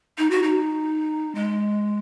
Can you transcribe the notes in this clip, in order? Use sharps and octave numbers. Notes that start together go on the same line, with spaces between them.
D#4
F#4
D#4
G#3